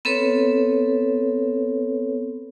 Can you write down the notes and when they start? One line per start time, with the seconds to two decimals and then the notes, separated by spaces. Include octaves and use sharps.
0.05 B3 C4 A4 B4 C#5